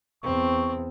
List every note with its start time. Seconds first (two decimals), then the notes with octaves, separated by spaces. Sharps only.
0.23 E2 C4 C#6